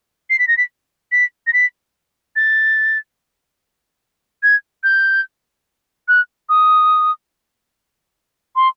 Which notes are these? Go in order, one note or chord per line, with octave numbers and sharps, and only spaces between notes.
C7
B6
A#6
B6
B6
A#6
B6
A6
G#6
G6
F#6
D#6
C6